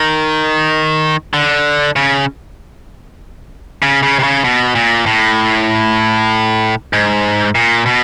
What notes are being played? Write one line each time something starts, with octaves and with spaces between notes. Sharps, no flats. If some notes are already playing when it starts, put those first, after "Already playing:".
Already playing: D#3
D3
C#3
C#3
C#3
C3
C#3
B2
A#2
A2
G#2
A#2
B2